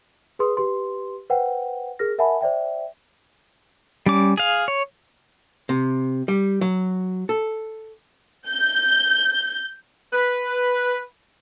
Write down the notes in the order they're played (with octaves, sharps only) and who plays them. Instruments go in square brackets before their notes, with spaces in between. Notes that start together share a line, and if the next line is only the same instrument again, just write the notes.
[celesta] G#4 B4 C6 D#6
G4 B4 C6
B4 C5 F#5 G5
G#4 A#4 F6 A#6
A#4 E5 F#5 G#5 A5 B5
C5 D5 E5 G5
[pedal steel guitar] G3 C#4 D6
G#4 F5
C#5
[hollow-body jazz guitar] C3
G3
F#3
A4
[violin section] G6
[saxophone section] B4